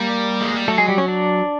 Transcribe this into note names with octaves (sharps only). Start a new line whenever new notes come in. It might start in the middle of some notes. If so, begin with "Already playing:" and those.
Already playing: G3 A#3 A#4
G#3
G3
F#3 A3 A4
G#3 G#4
G3 G4
C#4 C#5
D4 D5